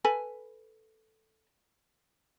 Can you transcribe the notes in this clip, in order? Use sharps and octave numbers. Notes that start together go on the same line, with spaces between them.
A4 B4 G#5